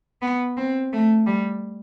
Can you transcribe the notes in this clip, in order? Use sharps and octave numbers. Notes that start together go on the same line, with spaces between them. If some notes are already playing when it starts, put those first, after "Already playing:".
B3
C4
A3
G3